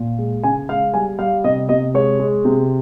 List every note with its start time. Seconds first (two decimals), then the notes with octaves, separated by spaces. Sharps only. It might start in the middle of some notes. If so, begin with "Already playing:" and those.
Already playing: A#2
0.19 G#3
0.44 C#3 G#5
0.69 G#3 F5
0.94 G3 G#5
1.19 G3 F5
1.44 C3 D#5
1.69 C3 D#5
1.94 G#3 C#5
2.20 G#3
2.45 C3